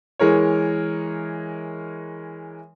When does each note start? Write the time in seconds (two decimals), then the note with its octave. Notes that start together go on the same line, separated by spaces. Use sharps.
0.19 E3 G#3 A#4 C#5